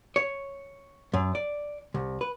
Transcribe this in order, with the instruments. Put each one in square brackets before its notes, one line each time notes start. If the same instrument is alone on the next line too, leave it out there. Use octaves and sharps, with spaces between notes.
[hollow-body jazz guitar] C#5
F#2
D5
C2
B4